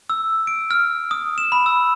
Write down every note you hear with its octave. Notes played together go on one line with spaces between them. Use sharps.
E6
D7
F6
D#6
E7
B5
E6